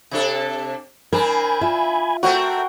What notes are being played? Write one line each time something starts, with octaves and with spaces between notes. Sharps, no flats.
C3 D4 A4
C4 D4 A#4 G#5 B5 G#6
F4 E5
A3 C4 F#4 A#4 G5